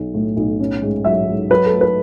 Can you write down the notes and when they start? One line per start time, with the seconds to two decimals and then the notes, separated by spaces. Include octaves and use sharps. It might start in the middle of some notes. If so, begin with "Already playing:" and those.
Already playing: B1 F#3
0.14 A2
0.37 B1
0.60 C#4
0.82 G#2
1.05 F#3 E5
1.28 G#2
1.50 F#3 B4
1.66 A4
1.73 A3
1.81 B4